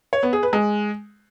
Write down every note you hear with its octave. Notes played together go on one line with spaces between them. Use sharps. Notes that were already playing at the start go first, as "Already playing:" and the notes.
C#5
B3
G#4
B4
G#3